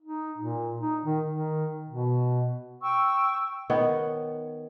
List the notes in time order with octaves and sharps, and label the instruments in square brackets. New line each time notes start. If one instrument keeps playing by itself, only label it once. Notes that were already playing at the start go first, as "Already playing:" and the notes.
[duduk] D#4
A#2
D#4
D#3
D#3
B2
[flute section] G5 C#6 E6
[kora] D#3 B3 C#5